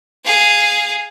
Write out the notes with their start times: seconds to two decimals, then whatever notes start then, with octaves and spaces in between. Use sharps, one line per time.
0.25 G#4 F5